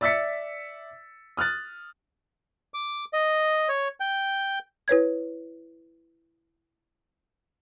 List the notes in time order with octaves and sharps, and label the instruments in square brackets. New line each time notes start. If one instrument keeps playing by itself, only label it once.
[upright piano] D5 E5 E6 A6 B6 C#7
D#6 F6 F#6 A6
[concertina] D6
D#5
C#5
G5
[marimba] E4 B4 C#5 G#6